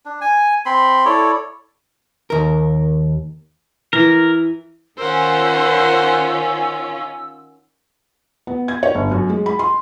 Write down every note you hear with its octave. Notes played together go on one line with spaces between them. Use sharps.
D4
G#5
C4 B5 C6
E4 A4 C#5 D5
D#2 A#4
E3 A#4
D#3 C#4 F4 A#4 C5 F#5 E6
B3
G#6
C#5
G1
F#2
G#3
B5
C6